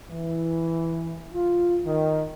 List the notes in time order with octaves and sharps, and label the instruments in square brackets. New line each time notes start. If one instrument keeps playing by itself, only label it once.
[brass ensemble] E3
F4
D#3